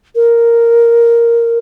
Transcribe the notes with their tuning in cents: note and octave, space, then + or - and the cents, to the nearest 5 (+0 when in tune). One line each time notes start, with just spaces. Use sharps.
A#4 +0